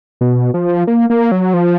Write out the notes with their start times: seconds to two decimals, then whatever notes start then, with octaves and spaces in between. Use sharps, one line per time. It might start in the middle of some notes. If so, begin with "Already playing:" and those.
0.21 B2
0.54 F3
0.87 A#3
1.10 A#3
1.32 F#3
1.54 F3